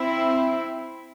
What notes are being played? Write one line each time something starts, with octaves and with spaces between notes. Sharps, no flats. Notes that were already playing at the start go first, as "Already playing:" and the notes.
Already playing: C4 E4